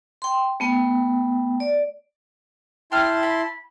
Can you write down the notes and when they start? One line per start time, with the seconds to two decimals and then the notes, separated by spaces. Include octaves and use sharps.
0.22 G5 C6
0.60 A3 B3 G5
1.60 D5
2.92 E4 G5 A5 C6 F6
3.23 B5